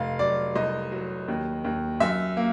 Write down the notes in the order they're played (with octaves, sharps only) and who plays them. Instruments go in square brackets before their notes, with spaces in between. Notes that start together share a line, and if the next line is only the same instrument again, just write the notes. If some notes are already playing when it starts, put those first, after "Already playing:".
Already playing: [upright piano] F1 F5
F#3 D5
C2 D#5
F#3
D#2
D#2
F#2 E5
A#3